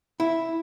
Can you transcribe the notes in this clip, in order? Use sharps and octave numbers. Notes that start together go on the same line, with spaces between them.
E4